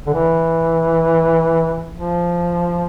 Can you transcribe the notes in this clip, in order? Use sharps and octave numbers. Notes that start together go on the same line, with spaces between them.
D3
E3
F3